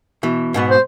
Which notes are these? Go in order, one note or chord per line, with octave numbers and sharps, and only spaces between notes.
B2 E3
G#2 B2 B3
C5